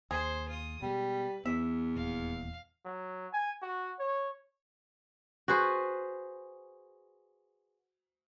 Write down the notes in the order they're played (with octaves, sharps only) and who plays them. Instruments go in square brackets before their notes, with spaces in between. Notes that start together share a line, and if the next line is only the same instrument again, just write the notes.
[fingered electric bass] D#2 [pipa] G#4 [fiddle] C5
[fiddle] F4 D#6
[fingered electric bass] B2 G#3 [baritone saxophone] G3 [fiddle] B4
[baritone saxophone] E2 [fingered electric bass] B3 [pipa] E5
[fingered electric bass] D#1 A#2 [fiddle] F5
[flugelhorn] F#3
G#5
F#4
C#5
[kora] F#4 G#4 B4 C5